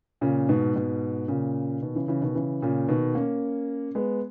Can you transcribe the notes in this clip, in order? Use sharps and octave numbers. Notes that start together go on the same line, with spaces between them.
A#2 C#3
G#2 B2
G#2 B2
A#2 C#3
B2 D#3
C#3 E3
C#3 E3
B2 D#3
C#3 E3
A#2 C#3
B2 D#3
A#3 C#4
G#3 B3